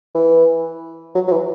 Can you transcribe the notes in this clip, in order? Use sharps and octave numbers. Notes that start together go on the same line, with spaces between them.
E3
F#3
F#3
E3